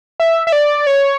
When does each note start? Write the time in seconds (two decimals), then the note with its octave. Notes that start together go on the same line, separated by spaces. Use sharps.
0.20 E5
0.47 E5
0.52 D5
0.87 C#5